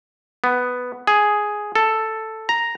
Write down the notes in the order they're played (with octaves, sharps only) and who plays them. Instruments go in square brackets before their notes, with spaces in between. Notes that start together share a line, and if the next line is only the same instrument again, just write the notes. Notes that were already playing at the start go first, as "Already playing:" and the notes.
[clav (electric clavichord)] B3
G#4
A4
A#5